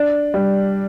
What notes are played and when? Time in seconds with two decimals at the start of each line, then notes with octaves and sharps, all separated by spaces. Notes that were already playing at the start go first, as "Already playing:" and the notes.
Already playing: D4
0.34 G3